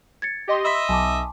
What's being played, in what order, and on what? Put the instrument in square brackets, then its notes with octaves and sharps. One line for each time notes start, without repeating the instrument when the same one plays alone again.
[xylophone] G#6 A6 C#7
[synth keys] G4 D#5 C6
[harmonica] D#5 E5 D#6 [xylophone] B5 C6 B6 [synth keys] E6
[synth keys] B1 [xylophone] G#5 A5 D6